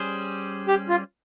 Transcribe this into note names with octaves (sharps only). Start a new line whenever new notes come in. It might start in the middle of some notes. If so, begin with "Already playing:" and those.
Already playing: G3 C#4 G#4 C5
G4
F4